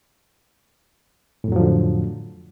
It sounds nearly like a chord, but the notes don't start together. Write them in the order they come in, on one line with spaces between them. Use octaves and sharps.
A2 F2 F#3 F3 D3